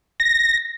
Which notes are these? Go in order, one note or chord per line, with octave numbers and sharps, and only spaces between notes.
A#6